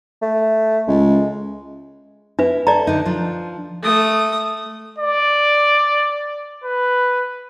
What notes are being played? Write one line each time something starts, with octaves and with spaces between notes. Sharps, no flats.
A3
C#2 G#3
D4 E4 B4
A4 D5 A#5
D3 D#4
F3 D4 F4
A3 D#6
D5
B4